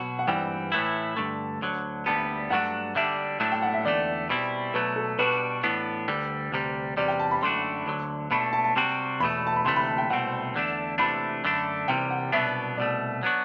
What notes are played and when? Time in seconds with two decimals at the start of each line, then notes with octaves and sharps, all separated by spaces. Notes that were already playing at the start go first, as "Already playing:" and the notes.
Already playing: B2 F#3 F#4 F#5
0.19 F#5
0.27 G2 E3 G3 C4 G5
0.72 A2 E3 A3 E4
1.17 G2 D3 A3
1.61 D2 D3 F#3
2.06 D2 D3 G3 B3 A5
2.50 G2 F#3 A3 D4 F#4 F#5
2.95 D3 G3 D4 E5
3.40 A2 F#3 A3 D4
3.52 G5
3.62 F#5
3.74 E5
3.85 E2 D3 A3 D5
4.29 B2 G3 C4 E4
4.74 B2 F#3 A3 B4
4.96 A4
5.19 B2 G3 D4 F#4 B4
5.63 A2 E3 B3 D4
6.08 D2 D3 G3
6.52 D2 C3 G3
6.97 E2 C3 G3 D5
7.08 G5
7.19 A5
7.31 B5
7.42 F#2 D3 A3 D4 F#4 C6
7.86 D2 D3 F#3
8.31 B2 A3 D4 B5
8.53 A5
8.64 A5
8.76 C3 G3 C4 F#4
9.20 E2 B2 A3 B5
9.47 A5
9.56 B5
9.65 D2 C3 E3 A3 C6
9.76 B5
9.87 A5
9.98 G5
10.10 C2 B2 A3 C4 F#5
10.54 E2 D3 A3 D4
10.98 C3 E3 A3 D4 B5
11.44 F#2 D3 A3 D4
11.88 C2 C3 E3 G3 G5
12.10 F#5
12.32 C2 B2 F#3 B3 D4 E5
12.77 C2 B2 A3 D5
13.23 F#3 B3 D4 F#4